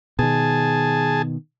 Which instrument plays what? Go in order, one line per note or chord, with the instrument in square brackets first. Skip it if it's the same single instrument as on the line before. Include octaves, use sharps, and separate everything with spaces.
[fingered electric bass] B2 D#3 [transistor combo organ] G#4 A5